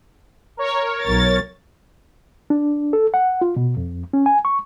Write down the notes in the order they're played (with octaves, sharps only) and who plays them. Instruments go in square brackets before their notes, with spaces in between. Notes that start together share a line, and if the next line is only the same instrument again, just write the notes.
[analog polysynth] A#4 C#5
[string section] B1 A6
[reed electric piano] D4
A4
F#5
F4
B2
F2
C#4
G#5
C#6